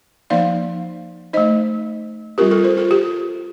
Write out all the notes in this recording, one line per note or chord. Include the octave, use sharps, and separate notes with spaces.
F3 A#3 D#4 D5 F5
A3 D#4 C5 D#5
G3 C4 F4 G4 A#4
F4 A4
A4 C5
F4 A4
G4